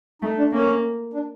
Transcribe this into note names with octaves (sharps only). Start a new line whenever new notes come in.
A3 D#4
D4
A#3 C#4
D4